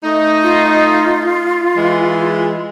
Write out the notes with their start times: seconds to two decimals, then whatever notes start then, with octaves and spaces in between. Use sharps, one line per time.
0.04 A3 D#4
0.43 F4
1.77 E3 G#3